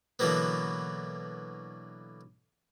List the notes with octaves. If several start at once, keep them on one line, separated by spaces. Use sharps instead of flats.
B2 D3 E3 F#3 A#3 B3